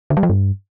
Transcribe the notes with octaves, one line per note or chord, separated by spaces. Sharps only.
D3
G3
F3
G2